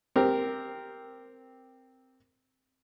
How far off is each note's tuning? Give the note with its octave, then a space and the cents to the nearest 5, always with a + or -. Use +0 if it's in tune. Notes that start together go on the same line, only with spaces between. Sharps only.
C4 +0 G4 +0 A#4 +0